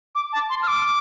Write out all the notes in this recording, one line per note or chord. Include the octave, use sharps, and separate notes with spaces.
D6
A5
C6
F6
D6